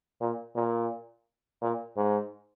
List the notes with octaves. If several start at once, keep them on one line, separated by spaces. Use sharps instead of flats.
A#2
A#2
A#2
G#2